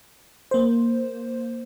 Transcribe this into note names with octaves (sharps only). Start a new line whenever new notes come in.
A#3 C5